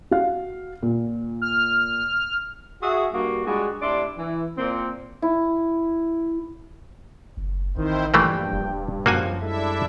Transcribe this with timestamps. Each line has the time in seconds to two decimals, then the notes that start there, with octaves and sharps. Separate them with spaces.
0.11 F#4 F5
0.82 A#2
1.42 F6
2.82 F#4 G#4 E5
3.13 G2 A#3 F#4
3.46 G3 G#3 D4 F4 F#4 G#4
3.82 A2 C3 D4 D5 E5 C6
4.17 E3
4.57 A#2 C4
5.22 E4
7.37 F#1
7.77 A1 D#3 C4 E4 C5
8.14 A#1 G2 E3 G3 A3 A#3 G5
8.53 D#1
9.06 C#2 F#2 F3 A#3 F#4 G#5
9.41 G3 G#3 D4 E4 A4 E5